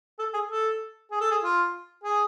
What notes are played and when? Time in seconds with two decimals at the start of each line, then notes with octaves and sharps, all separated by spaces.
0.19 A4
0.33 G#4
0.49 A4
1.11 G#4
1.21 A4
1.31 G#4
1.43 F4
2.04 G#4